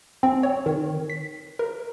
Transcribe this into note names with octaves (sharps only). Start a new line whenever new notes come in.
C4
C#5
D#3
B6
A#4